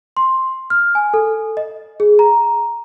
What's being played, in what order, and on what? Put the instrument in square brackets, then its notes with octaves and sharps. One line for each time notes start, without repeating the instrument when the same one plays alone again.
[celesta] C6
F6
G#5
A4
D#5
G#4
A#5